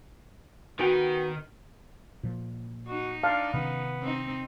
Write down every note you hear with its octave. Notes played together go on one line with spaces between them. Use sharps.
D#3 B3 F#4 G5
A#2 F3
D#4 F#4
D4 F5 A5
C3 D#3 B3 C#4
C4 D#4